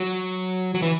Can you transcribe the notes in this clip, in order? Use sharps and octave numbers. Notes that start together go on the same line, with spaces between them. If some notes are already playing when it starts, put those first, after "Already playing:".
Already playing: F#3
F#3
E3